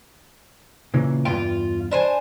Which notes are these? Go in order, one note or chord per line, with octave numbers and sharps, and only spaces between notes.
A#2 C#3 E3
E2 G2 F4 G5
D4 C5 G#5